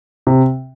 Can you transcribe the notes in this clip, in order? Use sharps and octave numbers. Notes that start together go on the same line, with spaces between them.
C3